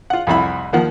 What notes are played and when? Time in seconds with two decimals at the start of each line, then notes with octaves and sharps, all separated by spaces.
0.10 F4 F#5
0.27 C2 F2 E4 B5
0.73 D#2 D#3 F3 F#5